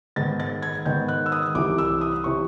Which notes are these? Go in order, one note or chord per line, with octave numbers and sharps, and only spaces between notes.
G#2 D#3 G#3 B3 A6
A6
G#6
G#2 D#3 G#3 B3 G6
F#6
E6
D#6
C2 C3 E3 D6
E6
D#6
C3 E3 C#6